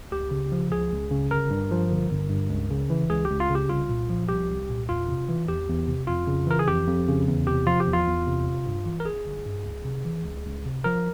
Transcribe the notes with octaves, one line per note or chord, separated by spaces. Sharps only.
C#2 G4
C#3
F3
C#2 G#4
C#2
C#3
G1 A#4
G2
F3
G1
G1
G2
C#2
C#3
E3
C#2 G#4
C#2 G4
F4
C#3
G4
C2 F4
A#2
F3
C2 G4
C2
A#2
E2 F4
C3
E3
E2 G4
E2
C3
F2 F4
C#3
E3 A#4
G#4
F2 G4
F2
C#3
E2
C3 G4
F3 F4
G4
E2
F4
E2
C3
G1
G2
E3
A#4
G1 G#4
G1
G2
C#2
C3
E3
C#2
C#2
C3
F3 A#4